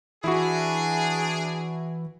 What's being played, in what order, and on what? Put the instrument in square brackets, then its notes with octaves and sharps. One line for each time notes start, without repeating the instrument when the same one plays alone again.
[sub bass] E3 [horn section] D4 G#4 [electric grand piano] E4 F#4